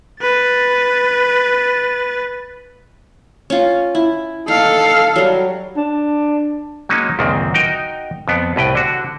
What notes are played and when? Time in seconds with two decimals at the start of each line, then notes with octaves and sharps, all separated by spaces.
0.22 B4 A6
3.50 C#4 F4
3.95 E4
4.48 D#4 A4 F5
5.16 F#3 G3
5.77 D4
6.89 F#3 G#3 A#3 C#4 D#4
7.19 C#2 F#2 A#2 D#3 C4
7.54 D#4 F#4 A#4 D#5 G5
8.28 F2 B3
8.56 C2 A2 B4 G5
8.75 D3 F#4